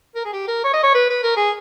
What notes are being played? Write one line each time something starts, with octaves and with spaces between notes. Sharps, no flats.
A#4
G#4
G4
A#4
C#5
D#5
C#5
B4
B4
A#4
G#4